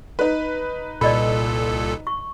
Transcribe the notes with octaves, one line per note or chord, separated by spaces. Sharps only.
D#4 B4
C2 A#2 A4 D5 D#5 B5
C#6